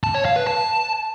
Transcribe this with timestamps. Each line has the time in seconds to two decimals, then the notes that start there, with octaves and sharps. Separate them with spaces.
0.04 A5
0.15 C#5
0.25 F5
0.36 B4
0.47 A5